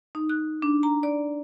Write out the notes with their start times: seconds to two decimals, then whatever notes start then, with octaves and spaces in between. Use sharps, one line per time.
0.15 D#4
0.29 F#6
0.62 D4
0.83 A#5
1.03 D5